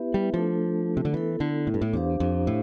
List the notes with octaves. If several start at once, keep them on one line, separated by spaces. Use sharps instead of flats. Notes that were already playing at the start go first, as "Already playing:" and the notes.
Already playing: B3 E4 G4 B4 E5
G3
F3 A3 D4 A4
C3
D3
E3 B3 E4 A4
D3
A2
G2
A2
E2 D4 G4 C5 F5
F2
A2